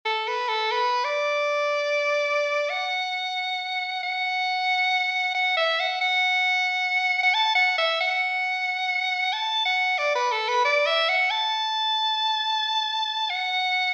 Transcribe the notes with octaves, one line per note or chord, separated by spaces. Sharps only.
A4
B4
A4
B4
D5
F#5
F#5
F#5
E5
F#5
F#5
F#5
A5
F#5
E5
F#5
A5
F#5
D5
B4
A4
B4
D5
E5
F#5
A5
F#5